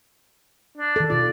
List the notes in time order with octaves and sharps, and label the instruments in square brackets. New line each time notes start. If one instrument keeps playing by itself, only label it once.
[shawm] D4
[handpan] D#3 A4
[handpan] B2 F4 [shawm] D5